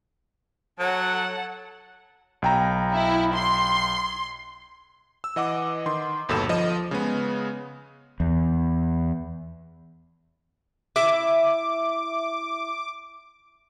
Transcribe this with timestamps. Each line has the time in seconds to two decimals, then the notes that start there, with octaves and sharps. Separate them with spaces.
0.79 F#3 A4 F#5
2.42 B1 G5 A#5
2.92 E4
3.34 C6
5.24 E6
5.36 E3 D#5 F#5 D6
5.86 D#3 C6
6.29 G1 D#2 B2 A4 B5 E7
6.49 F3 D#5
6.91 C#3 G#3 B3
8.20 E2
10.96 E4 E5 D6